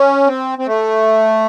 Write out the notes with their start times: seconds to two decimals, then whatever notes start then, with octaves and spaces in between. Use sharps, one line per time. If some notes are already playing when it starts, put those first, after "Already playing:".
Already playing: C#4
0.27 C4
0.59 C4
0.67 A3